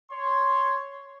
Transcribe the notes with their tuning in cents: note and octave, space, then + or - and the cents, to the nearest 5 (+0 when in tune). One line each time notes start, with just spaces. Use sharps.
C#5 +0 C6 +0